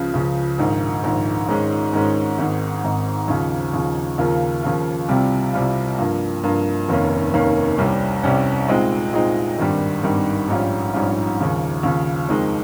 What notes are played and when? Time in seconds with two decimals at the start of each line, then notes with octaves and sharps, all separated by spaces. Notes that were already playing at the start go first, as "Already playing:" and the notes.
Already playing: C#2 C#3 F3
0.14 C#2 C#3 F3
0.58 A#1 G#2 D#3
1.04 A#1 G#2 D#3
1.48 G#2 D#3 G#3 C#4
1.93 G#2 D#3 G#3 C#4
2.38 G#1 G#2 D#3
2.84 G#1 G#2 D#3
3.28 D#2 C#3 F3
3.73 D#2 C#3 F3
4.18 D#2 C#3 F3 A#3 F4
4.63 D#2 C#3 F3 A#3 F4
5.08 C2 C3 G3 C4 F4
5.53 C2 C3 G3 C4 F4
5.98 G2 F3 A#3
6.43 G2 F3 A#3
6.88 F1 D#2 D#3 A#3 C#4
7.34 F1 D#2 D#3 A#3 C#4
7.78 C2 C3 G3 C#4
8.23 C2 C3 G3 C#4
8.68 A#2 G#3 C4 D#4
9.13 A#2 G#3 C4 D#4
9.58 G#1 G2 D#3 G3
10.03 G#1 G2 D#3 G3
10.48 A#1 G#2 G3 C#4 F4
10.93 A#1 G#2 G3 C#4 F4
11.39 D#2 C#3 F3
11.83 D#2 C#3 F3
12.29 F2 D#3 G#3 C4